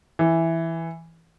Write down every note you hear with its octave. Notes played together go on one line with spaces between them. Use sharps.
E3